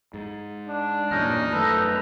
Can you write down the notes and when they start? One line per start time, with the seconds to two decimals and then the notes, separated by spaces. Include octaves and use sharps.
0.14 G#2
0.68 D4
1.11 E2 G2 A#2 C#4 D#4 F6
1.52 F#2 D#3 A3 A4 B4 E5 A#5